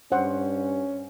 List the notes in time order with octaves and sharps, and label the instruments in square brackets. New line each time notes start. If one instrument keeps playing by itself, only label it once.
[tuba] G2 [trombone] C#4 [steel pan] C5 F#5